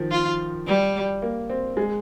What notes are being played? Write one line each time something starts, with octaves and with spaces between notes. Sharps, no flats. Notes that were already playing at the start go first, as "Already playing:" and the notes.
Already playing: D#3 F3
F4
G3
A#3
C4
G#3